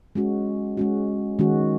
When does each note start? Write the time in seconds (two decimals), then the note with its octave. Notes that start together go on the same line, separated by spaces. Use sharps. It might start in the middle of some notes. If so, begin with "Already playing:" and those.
0.15 G#3 C#4 F#4
0.77 G#3 C#4 F#4
1.39 D#3 G#3 C#4 F#4